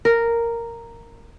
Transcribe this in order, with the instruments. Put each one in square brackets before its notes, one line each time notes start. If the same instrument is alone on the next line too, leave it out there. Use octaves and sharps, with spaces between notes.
[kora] A#4